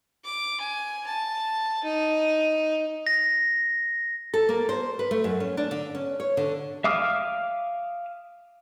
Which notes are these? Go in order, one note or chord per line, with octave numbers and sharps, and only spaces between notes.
D6
G#5
A5
D#4
A#6
A4
A#3
C5
B4
A3
F#2
C#4
D4
D3
C#4
C#5
D3
E5 F5 D6 D#6 F6